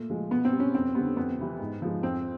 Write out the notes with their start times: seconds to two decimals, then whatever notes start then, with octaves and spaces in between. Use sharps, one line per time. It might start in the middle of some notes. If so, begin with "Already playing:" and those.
Already playing: A#2 A3
0.10 F3 G#3
0.31 B2 B3
0.45 C4
0.53 G3
0.60 C#4
0.75 F2 C4
0.95 D3 G3 B3
1.17 F2 B3
1.39 C3 E3 G3
1.60 G#2
1.82 F3 G#3
2.03 F2 C4